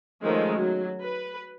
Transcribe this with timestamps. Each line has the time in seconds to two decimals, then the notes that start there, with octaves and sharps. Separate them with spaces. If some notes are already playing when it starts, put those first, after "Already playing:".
0.22 D#3 F3 G#3 A3 C#4
0.56 F#3
1.03 B4